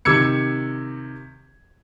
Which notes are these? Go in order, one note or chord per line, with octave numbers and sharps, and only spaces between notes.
C3 D#3 D6 E6 G#6 C#7